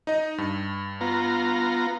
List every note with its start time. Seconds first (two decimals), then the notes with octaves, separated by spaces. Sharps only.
0.07 D#4 D#5
0.38 G2
1.01 B3 F4 A#5